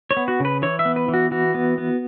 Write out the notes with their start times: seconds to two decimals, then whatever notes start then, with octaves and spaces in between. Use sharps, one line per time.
0.11 C#5
0.17 B3
0.28 F#4
0.40 C#3 B4
0.62 E3 C#5
0.79 E5
0.85 B3
0.96 B4
1.08 E3
1.14 F#4
1.31 E3 F#4
1.54 B3
1.78 B3